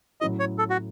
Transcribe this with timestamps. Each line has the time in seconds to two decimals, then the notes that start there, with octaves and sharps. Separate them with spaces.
0.21 A2 F#3 C#4 E4 D#5
0.39 C#5
0.58 A4
0.70 F#4